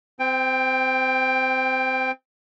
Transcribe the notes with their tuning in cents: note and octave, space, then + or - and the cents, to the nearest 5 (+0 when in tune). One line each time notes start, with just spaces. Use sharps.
C4 -20 G5 +15